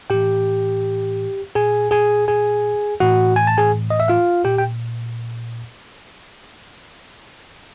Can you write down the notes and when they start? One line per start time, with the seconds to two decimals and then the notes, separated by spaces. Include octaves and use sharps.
0.10 A2 E3 G4 G5
1.55 A#2 G#4 G#5
1.91 G#4 G#5
2.28 G#4 G#5
3.00 A2 E3 F#4 F#5
3.36 G#5
3.47 A5
3.58 G#4 G#5
3.90 D#5
4.00 E5
4.08 F4 F5
4.45 A#2 G4 G5
4.58 G5